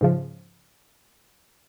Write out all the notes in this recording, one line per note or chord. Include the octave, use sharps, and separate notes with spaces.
G#2 C#3 F3